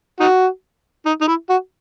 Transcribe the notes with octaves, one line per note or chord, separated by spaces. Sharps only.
D#4 F#4
D#4
D#4
E4
F#4